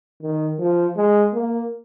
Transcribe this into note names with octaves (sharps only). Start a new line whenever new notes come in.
D#3
F3
G#3
A#3